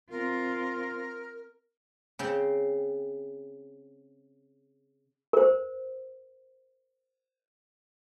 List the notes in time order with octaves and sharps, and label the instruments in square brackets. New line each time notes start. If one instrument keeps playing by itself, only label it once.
[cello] C4 F4 [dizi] A#4
[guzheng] C#3 C4 G5
[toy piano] A#4 C5